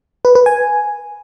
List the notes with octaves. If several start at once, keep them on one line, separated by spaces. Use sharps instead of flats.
B4
B4
G#5